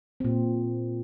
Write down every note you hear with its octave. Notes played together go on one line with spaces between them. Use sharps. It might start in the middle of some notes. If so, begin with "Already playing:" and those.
A#2 C4